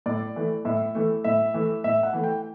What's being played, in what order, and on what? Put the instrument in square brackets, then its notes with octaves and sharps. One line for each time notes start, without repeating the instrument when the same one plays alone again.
[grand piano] A2 D5
E3 A3
A2 E5
E3 A3
A2 E5
E3 A3
A2 E5
F#5
E3 A3
G5